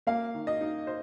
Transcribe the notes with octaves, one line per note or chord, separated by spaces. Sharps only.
A#3 F5
D#3
D#5
D#4
C5